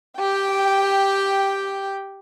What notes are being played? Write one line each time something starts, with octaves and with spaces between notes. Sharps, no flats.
G4 G5